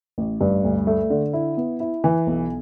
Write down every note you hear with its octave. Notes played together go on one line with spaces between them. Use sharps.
A1
G2
D2
A3
D3
E4
B3
E4
E3
B1